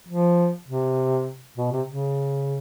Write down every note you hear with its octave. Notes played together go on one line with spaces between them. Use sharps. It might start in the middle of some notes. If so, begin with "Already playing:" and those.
F3
C3
B2
C3
C#3